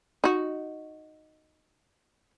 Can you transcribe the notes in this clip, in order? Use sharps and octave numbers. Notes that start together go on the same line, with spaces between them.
D#4 F#4